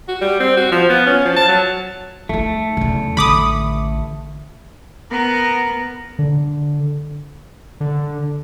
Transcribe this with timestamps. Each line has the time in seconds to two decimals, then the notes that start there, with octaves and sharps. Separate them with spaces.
0.08 F#4
0.21 G3
0.40 C4
0.57 F#4
0.72 F3
0.90 B3
1.06 C#4
1.24 F3
1.36 A5
1.48 F#3
2.29 A3 D#4 E4
2.77 E2 C#3
3.17 A1 D3 B5 D6 D#6
5.11 B3 A#4
6.19 D3
7.80 D3